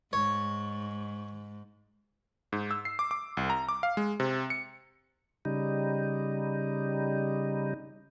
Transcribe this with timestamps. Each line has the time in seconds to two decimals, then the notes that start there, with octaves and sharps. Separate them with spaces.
0.13 G#2 C#5
2.52 G#2
2.71 E6
2.85 C7
2.99 D6
3.11 D6
3.37 C2
3.50 A#5
3.69 D6
3.83 F5
3.97 G#3
4.20 C3
4.50 C#7
5.45 C#3 G3 D#4